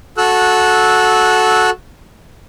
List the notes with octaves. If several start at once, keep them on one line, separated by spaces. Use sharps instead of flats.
F#4 A4 E6 F#6